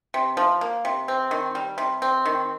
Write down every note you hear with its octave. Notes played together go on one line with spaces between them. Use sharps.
C3
F3
A#3
C3
C4
D#3
G3
C3
C4
D#3